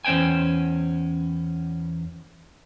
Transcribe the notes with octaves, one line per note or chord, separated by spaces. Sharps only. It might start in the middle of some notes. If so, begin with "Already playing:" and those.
E2 C#4 C5 G5 G#5